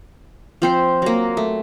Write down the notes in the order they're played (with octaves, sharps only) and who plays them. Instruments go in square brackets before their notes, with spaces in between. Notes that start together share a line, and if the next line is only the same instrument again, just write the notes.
[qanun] F3 C4 C5
F#3 A#3
A3